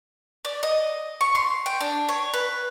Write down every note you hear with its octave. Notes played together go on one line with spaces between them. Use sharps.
D5
D#5
C#6
C6
G5
D4
C#5
B4